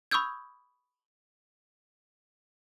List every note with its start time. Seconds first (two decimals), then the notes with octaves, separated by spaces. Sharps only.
0.11 B5 C#6 D#6 E6 G6 G#6